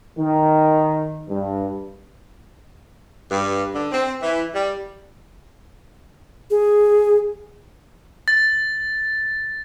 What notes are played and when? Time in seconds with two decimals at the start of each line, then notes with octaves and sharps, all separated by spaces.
0.18 D#3
1.28 G2
3.30 G2
3.74 D3
3.92 C4
4.23 E3
4.53 G3
6.51 G#4
8.28 A6